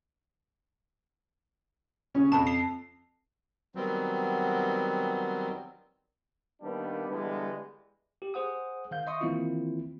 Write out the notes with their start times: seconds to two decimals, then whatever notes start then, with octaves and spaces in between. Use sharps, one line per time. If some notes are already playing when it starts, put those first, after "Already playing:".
2.14 C#3 C#4
2.32 F2 A5
2.47 C7
3.75 D#3 F#3 G3 B3 C4
6.61 D#3 G3 A#3 B3 D4
7.08 D3 E3 G3 G#3 B3 D4
8.22 G4
8.34 G#4 C5 F#5 D#6
8.91 D#3 F5 G6
9.07 D#5 E5 C6 C#6 D#6
9.21 D#3 E3 A#3 C4 E4 F4